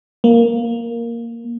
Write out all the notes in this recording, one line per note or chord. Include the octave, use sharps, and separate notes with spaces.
A#3